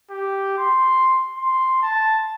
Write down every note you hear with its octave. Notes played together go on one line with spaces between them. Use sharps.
G4
C6
C6
A5